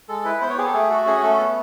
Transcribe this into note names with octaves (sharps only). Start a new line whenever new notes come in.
G#3 A4
E4 B4
B3 C5
C#5
G4 G#4
A4
A3 G#4
F#4 A4
C#4 G#4
A3 A4
B3